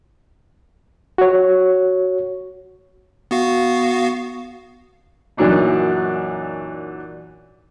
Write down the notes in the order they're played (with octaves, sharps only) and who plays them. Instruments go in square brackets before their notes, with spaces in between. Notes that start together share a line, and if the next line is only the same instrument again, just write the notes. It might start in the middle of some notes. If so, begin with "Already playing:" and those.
[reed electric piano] F#4 C#5
[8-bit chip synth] B3 F#4 F5
[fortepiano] F#2 A#2 E3 F#3 D4 D#4